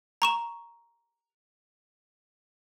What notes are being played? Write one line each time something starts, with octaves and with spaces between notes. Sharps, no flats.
A#5 C#6 E7